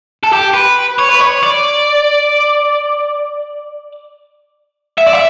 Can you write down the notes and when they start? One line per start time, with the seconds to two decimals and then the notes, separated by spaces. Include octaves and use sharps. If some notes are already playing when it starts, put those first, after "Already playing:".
0.24 A4
0.33 G4
0.54 B4
0.99 C#5
1.10 B4
1.21 C#5
1.43 D5
4.98 E5
5.07 D5
5.14 E5